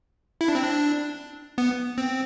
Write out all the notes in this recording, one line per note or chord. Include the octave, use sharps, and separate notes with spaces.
E4
D4
C4
D4
B3
C4